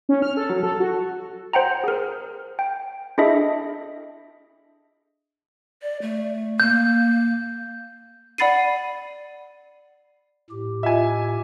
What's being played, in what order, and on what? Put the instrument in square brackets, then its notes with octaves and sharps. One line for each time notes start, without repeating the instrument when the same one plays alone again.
[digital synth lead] C#4
F6
A4
F#3
A4
F#4
[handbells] C5 F#5 G5 A#5
G#4 A#4
G5
D4 E4 G#4 A4 D#5 E5
[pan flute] D5
A3
[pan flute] A#3 [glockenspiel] G6
[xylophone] D5 F#5 B5 A6 C7 D#7
[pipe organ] A2 G4
[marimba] F4 D#5 [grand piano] E5 G#5